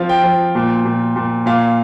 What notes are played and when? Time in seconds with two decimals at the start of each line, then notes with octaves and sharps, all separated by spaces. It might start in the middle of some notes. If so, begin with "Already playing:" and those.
Already playing: F3 C4 F5
0.09 G5
0.24 F3
0.55 A#2
0.85 A#2
1.16 A#2
1.46 A#2 F5